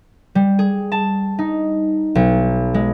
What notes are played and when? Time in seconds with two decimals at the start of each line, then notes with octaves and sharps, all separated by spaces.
0.35 G3
0.59 G#4
0.92 A5
1.39 D#4
2.15 B1
2.74 G#3